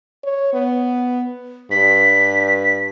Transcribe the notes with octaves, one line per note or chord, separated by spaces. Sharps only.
C#5
B3
G2 B6